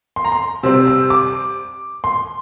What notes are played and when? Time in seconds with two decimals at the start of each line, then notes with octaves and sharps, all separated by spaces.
0.16 C6
0.25 A#5
0.32 C6
0.63 C3 G3 C4 E6
0.87 E6
1.10 D6
2.04 C6